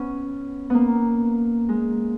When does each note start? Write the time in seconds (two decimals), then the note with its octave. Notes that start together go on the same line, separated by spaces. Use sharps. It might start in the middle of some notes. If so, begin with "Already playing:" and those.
Already playing: B3 C#4
0.70 A#3 B3
1.69 G#3